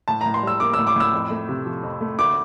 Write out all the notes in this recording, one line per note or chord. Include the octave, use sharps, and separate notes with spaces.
A2 A5
A2 A#5
C6
G3 E6
A#3 D6
A2 E6
D6
A2 E6
F2
A3
C3
F3
F2
A3
D2 D6